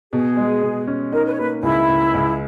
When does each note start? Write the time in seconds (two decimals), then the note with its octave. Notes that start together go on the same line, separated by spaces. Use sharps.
0.12 B2 G#4
0.37 G#3
0.62 B2
0.87 C#4
1.12 D#4 A#4
1.26 B4
1.33 C#5
1.38 A#3 B4
1.63 C#2 E4
1.89 C#2
2.14 C#2